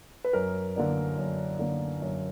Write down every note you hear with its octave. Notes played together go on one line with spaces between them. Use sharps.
B4
F#2 A#4
D3 A#3 D4
F#2
D3 A#3 D4
F#2